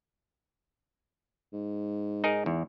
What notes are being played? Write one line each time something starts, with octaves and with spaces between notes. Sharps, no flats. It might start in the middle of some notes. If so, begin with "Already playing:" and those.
G#2
D#4 G#4 A#4
E2